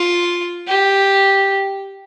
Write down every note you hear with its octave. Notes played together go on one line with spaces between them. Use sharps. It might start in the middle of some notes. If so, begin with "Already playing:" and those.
Already playing: F4
G4